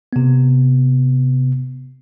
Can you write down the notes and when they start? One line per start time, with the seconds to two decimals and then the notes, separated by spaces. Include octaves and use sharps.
0.13 C3 B3